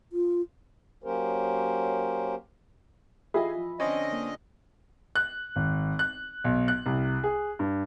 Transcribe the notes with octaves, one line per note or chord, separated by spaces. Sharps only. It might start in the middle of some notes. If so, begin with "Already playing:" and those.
F4
F#3 A#3 C#4 G4 A#4 C5
E3 E4 F4 G4 G#4 D#5 E5 B5
F3
D3 C4 C#4 D#5
A#3
F#6
G#1
F#6
B1
F#6
C2
G#4
G2